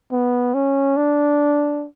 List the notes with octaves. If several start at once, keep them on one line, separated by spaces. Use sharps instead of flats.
B3
C#4
D4